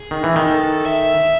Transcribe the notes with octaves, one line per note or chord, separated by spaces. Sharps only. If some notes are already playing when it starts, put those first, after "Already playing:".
Already playing: G#4
D#3
E3
D#3
A4
E5